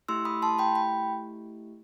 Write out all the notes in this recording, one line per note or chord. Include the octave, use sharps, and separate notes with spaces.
A3 E4 G4 C6 E6
B5 D#6
A5 C6
G5 B5
G5 B5